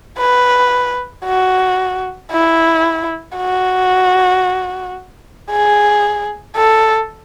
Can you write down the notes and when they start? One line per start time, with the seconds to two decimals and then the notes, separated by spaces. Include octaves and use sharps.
0.18 B4
1.25 F#4
2.32 E4
3.37 F#4
5.51 G#4
6.57 A4